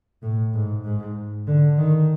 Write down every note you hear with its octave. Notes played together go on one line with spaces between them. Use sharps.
A2
G#2
G#2
D3
D#3